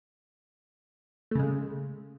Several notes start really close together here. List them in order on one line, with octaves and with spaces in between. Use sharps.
A3 C#3 G#3